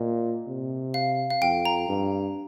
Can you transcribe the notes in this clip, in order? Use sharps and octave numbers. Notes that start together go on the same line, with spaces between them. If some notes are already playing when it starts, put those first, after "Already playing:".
Already playing: A#2 D#5
C3
F5
F5
F2 G5
A#5
G2